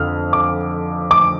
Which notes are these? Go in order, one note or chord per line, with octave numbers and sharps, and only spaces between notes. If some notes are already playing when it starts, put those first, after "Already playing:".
Already playing: F2 D3 F6
D6
D6